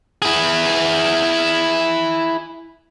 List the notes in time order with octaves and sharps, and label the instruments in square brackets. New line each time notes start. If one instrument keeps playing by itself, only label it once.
[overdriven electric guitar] E4 G#4